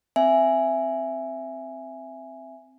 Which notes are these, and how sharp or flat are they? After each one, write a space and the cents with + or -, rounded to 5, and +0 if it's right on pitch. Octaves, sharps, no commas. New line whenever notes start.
C4 +0 E5 +10 G#5 +0